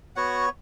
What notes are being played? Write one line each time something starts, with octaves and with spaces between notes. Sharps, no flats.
B3 F#4 C#5 F#5